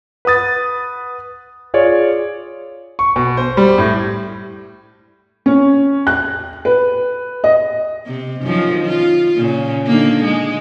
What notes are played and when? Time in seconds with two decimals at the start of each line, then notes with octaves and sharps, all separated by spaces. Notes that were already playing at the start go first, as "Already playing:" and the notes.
0.25 B4 F#5 D#6 A6
1.74 F4 G#4 C#5 D5
2.99 C#6
3.16 B2
3.37 C5
3.57 G3
3.78 A2
5.46 C#4
6.07 F#6
6.65 B4
7.44 D#5
8.07 C3
8.43 F#2 D#3 F3
8.85 F4
9.36 A#2 C#3
9.87 D3 D#3 A#3
10.24 G#3